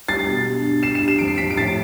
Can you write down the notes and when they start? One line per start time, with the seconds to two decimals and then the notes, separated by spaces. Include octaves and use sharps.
0.08 G3 A6 C7
0.27 B2
0.46 G2
0.65 G3
0.83 G2 C7 E7
0.95 C7 E7
1.02 G3
1.08 E7
1.19 F2 D7
1.28 C7
1.38 F3 B6 D7
1.50 D7
1.57 A2 A6 C7